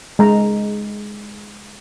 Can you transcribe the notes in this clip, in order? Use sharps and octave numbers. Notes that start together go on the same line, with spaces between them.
G#3 A#5